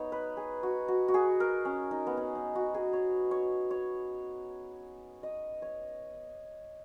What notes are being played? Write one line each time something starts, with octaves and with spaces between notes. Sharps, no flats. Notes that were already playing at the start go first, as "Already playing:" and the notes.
Already playing: B3 D#4 C#5
B4
G#4
F#4
F#4
F#4
G#4
A#4
C#4
D#4
B3
C#4
D#4
F#4
G#4
C#5
C#5
C#5
D#5
C#5